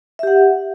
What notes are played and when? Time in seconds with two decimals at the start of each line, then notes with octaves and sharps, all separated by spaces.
0.19 E5
0.23 G4
0.27 F#5